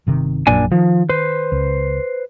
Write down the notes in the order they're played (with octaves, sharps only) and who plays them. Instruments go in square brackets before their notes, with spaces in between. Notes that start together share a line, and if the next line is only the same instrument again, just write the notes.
[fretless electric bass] G1 C3 D#3
[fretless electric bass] A#1 F#2 [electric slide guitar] A#2 D4 G#5
[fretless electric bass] D#3 [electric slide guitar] F3
[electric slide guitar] B4 C5
[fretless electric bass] C#2